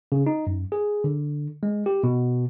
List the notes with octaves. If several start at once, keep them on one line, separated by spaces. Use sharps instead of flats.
C#3
D#4
F#2
G#4
D3
G#3
G4
B2